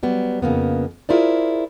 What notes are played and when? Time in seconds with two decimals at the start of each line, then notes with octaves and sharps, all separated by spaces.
0.03 F#3 G3 B3
0.42 F2 C#3 A#3 B3
1.09 E4 F4 G#4 A#4 C5 D5